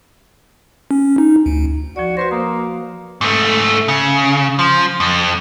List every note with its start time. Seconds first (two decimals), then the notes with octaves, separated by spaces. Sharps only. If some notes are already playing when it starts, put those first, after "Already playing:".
0.91 C#4
1.18 D#4
1.46 D2
1.96 F3 F#4 D5
2.17 F#4 B4 C5 A#6
2.31 A#3 D#6
3.21 G#2 A3
3.88 C#3
4.59 F3
5.00 F2